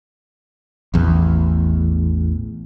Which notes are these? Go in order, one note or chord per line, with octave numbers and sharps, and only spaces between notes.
A1 E2